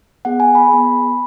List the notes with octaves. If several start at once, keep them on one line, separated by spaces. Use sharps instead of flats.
B3 G#4 F#5
G#5
B5
B3 G#4